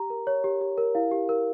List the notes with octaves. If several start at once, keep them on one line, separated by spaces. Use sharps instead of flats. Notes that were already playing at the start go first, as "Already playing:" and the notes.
Already playing: G4 A#5
A#4
C#5
G4
G4
A#4
E4 F5
G4
A#4